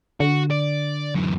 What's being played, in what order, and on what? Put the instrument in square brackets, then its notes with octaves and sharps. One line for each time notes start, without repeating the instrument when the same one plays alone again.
[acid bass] D3 [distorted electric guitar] F#4
[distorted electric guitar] D5
F#2 E3